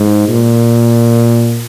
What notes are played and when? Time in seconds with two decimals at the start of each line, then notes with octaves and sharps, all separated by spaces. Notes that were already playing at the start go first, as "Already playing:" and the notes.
Already playing: G#2
0.29 A#2